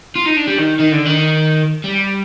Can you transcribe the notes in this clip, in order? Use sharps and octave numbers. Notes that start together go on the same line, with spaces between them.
F4
D#4
D4
G3
D#3
D#3
D3
D#3
G3